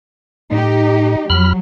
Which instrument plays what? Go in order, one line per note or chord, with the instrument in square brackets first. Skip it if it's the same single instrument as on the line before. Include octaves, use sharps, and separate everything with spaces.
[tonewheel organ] A2 [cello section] D#4 G4
[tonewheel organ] F2 B5 F6 [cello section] F#3